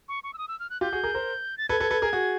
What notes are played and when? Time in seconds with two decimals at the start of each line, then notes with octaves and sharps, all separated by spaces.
0.09 C#6
0.24 C#6
0.34 E6
0.38 D#6
0.48 E6
0.60 F6
0.70 F#6
0.81 F4 G4 G6
0.93 F#4 G#4
1.03 G#4 A#4
1.14 A#4 C5
1.58 A6
1.69 A4 B4 G#6
1.80 A4 B4
1.90 A4 B4
2.02 G#4 A#4
2.13 F#4 G#4